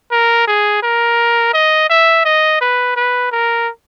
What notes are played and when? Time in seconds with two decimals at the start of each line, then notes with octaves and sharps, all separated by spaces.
0.12 A#4
0.48 G#4
0.83 A#4
1.54 D#5
1.90 E5
2.25 D#5
2.61 B4
2.96 B4
3.32 A#4